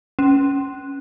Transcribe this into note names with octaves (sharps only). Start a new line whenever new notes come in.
C#4